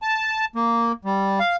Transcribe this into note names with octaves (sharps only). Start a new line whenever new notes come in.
A5
A#3
G3
F5